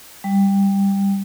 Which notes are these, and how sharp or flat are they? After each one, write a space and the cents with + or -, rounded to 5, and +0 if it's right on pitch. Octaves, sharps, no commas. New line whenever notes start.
G3 +10